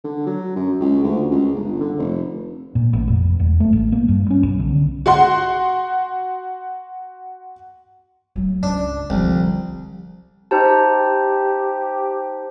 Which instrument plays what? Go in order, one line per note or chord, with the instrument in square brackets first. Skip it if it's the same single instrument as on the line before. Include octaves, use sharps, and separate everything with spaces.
[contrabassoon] D3
F#3
F#2
C#2
D2
C#2
G1
D3
F1
[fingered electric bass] A#2
A1
F1
E1
A3
A1
A#3
G2
C#4
B1
D3
[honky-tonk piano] F#4 F#5 C6
[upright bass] F#3 A3
[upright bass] C#2 [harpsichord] D4
[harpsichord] C2 [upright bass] D3 F3
[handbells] D#4 C5 A5 [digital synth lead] G4